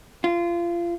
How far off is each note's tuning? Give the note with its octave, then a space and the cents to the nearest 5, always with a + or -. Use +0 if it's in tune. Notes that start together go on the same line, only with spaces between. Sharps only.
F4 -25